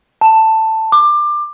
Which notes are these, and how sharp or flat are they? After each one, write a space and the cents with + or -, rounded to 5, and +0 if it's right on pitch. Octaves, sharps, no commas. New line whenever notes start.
A5 +10
D6 +20